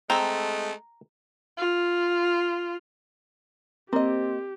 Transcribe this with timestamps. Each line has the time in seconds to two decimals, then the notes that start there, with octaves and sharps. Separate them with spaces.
0.10 G#3 A3 C4 A4 A#5
1.58 F4
3.93 A#3 C4 G4 D#5